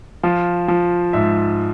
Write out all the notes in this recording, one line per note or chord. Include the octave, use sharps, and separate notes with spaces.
F3 F4
F3
G#2 E5